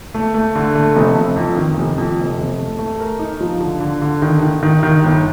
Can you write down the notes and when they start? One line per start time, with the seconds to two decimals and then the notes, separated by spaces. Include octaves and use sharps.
0.14 A3
0.34 A3
0.55 D3
0.75 A3
0.96 F1
1.16 F1
1.36 F2
1.57 D#3
1.77 F1
1.98 F2
2.19 F1
2.38 F1
2.58 A3
2.79 A3
3.00 A#4
3.19 D#4
3.41 F3
3.60 D3
3.81 D3
4.02 D3
4.22 D#3
4.43 D#3
4.63 D#3
4.83 D#3
5.04 G1